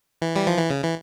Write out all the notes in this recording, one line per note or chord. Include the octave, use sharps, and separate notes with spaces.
E3
G3
F3
E3
C#3
E3